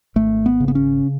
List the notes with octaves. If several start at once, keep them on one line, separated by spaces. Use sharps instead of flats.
G#1 A3
B3
C#3
B3
C#4